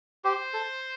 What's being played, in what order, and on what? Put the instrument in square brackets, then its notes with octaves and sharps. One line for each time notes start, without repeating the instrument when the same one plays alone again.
[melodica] G4 [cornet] C5
[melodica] A4